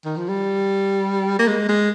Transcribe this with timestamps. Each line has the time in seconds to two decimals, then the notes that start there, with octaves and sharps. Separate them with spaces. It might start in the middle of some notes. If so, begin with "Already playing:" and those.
0.05 D#3
0.17 F3
0.29 G3
1.39 A#3
1.48 G#3
1.69 G#3